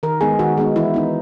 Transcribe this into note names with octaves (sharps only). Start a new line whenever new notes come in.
D#3 A#4
G#3 B3 D#4 G#4
D#3 F#4
G#3 B3 D#4
E3 E4
B3 D#4